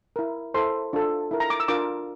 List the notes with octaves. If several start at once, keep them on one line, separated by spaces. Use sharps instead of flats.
E4 A#4
E4 A4 C5 C6
D4 F4 A4
E4 A#4
A#5
D6
E6
D4 F4 A#4 D6